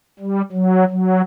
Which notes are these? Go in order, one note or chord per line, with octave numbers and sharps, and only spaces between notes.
G3
F#3
F#3